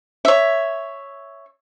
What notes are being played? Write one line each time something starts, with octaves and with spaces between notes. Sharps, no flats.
C#5 E5